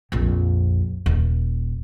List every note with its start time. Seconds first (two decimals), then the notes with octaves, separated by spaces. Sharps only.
0.12 A#1 F2
1.06 D#1